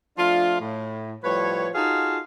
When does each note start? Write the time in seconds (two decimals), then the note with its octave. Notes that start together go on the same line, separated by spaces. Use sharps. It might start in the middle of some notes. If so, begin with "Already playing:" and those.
0.18 F3 A3 D4 F4
0.61 A2
1.24 A2 F3 G3 B4 C#5
1.74 D#4 F4 F#4 G#4 A4 F5